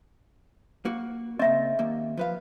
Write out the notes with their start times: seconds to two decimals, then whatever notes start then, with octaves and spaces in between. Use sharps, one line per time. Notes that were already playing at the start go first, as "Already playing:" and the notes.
0.85 A#3 F#4
1.39 C#3 A#3 C4 D#5 E5
1.79 D#2 A#3
2.17 F3 B4 F5